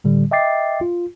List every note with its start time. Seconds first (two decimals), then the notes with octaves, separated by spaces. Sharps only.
0.04 A2 D3 G3
0.31 D#5 E5 G5 D6 A6 C7
0.81 F4